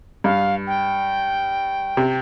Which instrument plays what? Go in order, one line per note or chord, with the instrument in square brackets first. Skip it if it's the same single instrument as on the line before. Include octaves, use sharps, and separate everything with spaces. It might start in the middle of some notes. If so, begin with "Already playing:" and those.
[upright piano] G2 [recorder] F5
[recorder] G5
[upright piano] C3